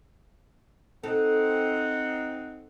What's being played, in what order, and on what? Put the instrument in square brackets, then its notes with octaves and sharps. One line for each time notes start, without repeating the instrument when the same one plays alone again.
[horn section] C4 D#4 F#5 [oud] A4